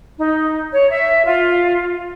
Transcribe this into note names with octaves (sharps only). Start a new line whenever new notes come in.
D#4
C#5
E5
F4